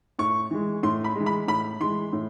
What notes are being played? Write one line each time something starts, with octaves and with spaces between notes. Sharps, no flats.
A2 C#6
E3 G#3
A2 C6
B5
E3 G#3
B5
A2 B5
E3 G#3 C6
A2